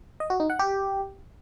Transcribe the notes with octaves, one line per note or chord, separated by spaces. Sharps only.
D#5
F#4
D#4
F#5
G4